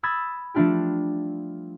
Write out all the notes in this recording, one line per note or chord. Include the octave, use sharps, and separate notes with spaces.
B5 D#6 E6 G#6 A6 B6
F3 G3 A3 D4 F4 G4